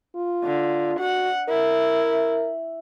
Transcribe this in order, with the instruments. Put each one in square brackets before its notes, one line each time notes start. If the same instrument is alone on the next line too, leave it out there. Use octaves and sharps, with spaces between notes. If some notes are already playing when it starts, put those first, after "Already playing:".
[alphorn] F4
[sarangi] D3
[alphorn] F#4 [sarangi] F#5
[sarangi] E4 [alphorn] A#4